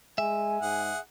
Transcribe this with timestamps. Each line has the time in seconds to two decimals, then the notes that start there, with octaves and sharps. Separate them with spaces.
0.18 G#3 E5 G#5
0.62 G#2 G#4 F#5